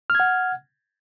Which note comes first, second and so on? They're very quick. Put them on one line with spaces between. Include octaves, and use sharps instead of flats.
F6 G#6 F#5